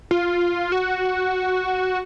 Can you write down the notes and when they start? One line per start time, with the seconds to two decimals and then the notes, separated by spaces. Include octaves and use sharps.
0.11 F4
0.72 F#4